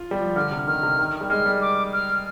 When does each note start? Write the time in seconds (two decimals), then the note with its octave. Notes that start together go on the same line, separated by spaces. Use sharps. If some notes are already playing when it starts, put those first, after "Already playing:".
Already playing: F4
0.11 G3
0.20 F3
0.36 D3 F6
0.51 C3
0.67 D#3 F6
0.83 C3
0.99 D#3
1.21 G3
1.30 G#3 F6
1.46 G3
1.62 D6
1.93 F6